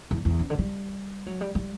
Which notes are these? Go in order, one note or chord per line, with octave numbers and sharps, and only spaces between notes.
E2
E2
C#3
D3
G3
F#3
G3
G3